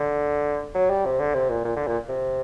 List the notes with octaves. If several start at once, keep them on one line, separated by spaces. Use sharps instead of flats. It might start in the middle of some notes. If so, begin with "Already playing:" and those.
Already playing: D3
F#3
G3
C3
D3
C3
A#2
A#2
D3
A#2
C3